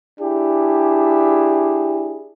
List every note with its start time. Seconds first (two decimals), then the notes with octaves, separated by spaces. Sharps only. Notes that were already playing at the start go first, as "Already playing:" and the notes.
0.20 D4 E4 G4 G#4